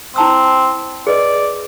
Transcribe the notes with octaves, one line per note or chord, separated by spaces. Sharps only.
C4 E4 A5 E6
G#4 B4 D5 D#5